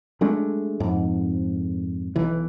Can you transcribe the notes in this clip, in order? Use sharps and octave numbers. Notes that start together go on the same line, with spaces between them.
F#3 G#3 A3 D4
F2 G#2
B1 E3